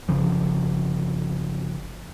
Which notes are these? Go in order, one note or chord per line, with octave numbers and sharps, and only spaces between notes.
G1 C#3 F3